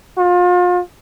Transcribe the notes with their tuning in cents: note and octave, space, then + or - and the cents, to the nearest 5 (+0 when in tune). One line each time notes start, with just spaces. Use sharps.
F4 +35